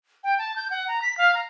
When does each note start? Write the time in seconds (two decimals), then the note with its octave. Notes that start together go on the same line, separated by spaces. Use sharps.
0.24 G5
0.38 A5
0.56 G6
0.70 F#5
0.88 A#5
1.02 B6
1.18 F5
1.34 A#5